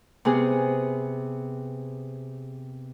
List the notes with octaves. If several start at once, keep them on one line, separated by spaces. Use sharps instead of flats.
C3 B3 G#4